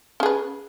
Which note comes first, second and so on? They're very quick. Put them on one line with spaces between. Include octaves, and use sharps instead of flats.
C#4 G#4 B4